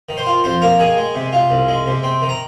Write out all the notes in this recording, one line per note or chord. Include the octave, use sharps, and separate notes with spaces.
D#3
C5 C6
F4
F2 C5 C6
A#3 A#4 A#5
D#3 G#4 G#5
G#3
C3
F4
C2
G#3
C3
C4
D#3
A#5